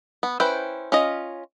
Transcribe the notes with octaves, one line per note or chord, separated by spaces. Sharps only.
B3
C#4 E4 B4 C5 G5
C#4 F4 D#5